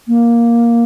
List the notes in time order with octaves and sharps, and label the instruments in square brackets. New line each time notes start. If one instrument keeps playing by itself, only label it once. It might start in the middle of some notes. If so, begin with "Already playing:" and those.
[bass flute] A#3